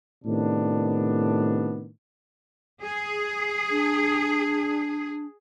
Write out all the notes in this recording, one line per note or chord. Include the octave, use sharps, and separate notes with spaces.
A2 C3 D#3 B3 D4
G#4
D4